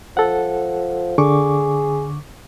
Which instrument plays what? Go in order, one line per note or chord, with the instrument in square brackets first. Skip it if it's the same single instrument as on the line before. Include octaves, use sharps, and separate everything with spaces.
[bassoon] F3 [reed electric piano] A4 F#5
[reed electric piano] D3 C#6 D6 [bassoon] G#4